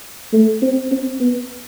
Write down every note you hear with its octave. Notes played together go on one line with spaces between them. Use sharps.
A3
C4
C4
B3